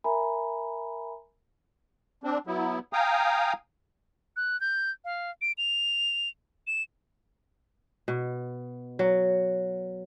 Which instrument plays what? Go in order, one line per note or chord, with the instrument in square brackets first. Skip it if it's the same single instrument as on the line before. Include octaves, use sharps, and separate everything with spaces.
[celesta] A#4 E5 G#5 A#5 B5
[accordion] C4 D4
F#3 B3 E4
F5 G5 G#5 A#5 D#6
[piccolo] F#6
G6
F5
D7
F7
E7
[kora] B2
F#3